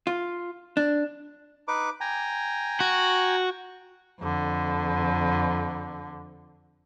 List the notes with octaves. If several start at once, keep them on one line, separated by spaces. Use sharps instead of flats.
F4
D4
D#4 B4 D6
G5 G#5 A#5
F#4
F2 D3